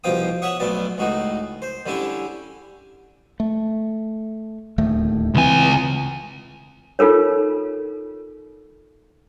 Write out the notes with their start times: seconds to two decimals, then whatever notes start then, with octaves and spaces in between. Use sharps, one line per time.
0.04 C2 B2 F3 F5 G5 D#6
0.42 C#5 E5 F#5 C#6 D#6
0.60 B1 B2 A3 B3 D5
0.98 C#2 A2 D#4 F#4
1.62 C5
1.86 D3 G3 C#4 E4 G4
3.40 A3
4.78 D1 D#2 A3
5.35 C#2 E3 C4 G#5
6.99 D#4 F4 A4 A#4 C#5